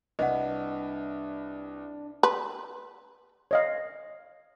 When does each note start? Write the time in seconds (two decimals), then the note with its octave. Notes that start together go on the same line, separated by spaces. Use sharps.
0.19 C2 D4 B4 D#5 F#5
2.23 B4
3.51 C#5 D#5 F5